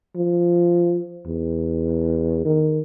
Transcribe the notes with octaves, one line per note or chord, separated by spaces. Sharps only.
F3
E2
D#3